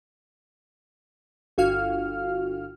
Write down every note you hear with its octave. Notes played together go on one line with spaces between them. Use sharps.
G1 F#4 F5 F6